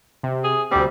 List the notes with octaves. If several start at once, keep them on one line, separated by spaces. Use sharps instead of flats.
C3
G#4
D2 C3 G3 C4